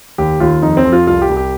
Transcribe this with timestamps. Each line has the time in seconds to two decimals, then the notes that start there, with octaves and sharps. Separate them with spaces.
0.18 D#2 G4
0.40 D#2 F4
0.62 F2 D#4
0.77 C4
0.85 F2
0.92 F4
1.07 C2 F4
1.22 G4
1.29 C2
1.37 G4